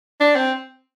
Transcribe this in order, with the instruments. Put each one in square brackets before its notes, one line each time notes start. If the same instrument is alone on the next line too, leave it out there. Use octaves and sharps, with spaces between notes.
[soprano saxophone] D4
C4